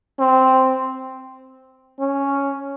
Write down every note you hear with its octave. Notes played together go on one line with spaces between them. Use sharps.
C4
C#4